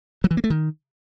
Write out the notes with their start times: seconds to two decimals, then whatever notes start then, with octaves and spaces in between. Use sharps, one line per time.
0.24 F#3
0.31 E3
0.37 A#3
0.44 A3
0.50 D#3